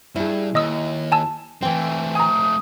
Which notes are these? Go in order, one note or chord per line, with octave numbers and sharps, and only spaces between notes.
G2 E4 G#4
D#2 D#5 D#6 E6
G#5 A5 E6
E3 A3 C4 G5
G#5 A#5 D#6